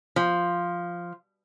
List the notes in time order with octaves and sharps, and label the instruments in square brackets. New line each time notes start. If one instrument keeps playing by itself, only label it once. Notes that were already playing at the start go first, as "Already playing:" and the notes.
[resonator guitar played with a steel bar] F3